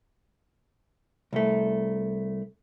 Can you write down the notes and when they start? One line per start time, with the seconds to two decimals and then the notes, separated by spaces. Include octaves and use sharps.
1.33 C2 A3